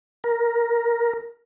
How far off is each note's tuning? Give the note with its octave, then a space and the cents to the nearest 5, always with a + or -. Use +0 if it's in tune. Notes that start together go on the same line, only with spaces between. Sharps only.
A#4 +10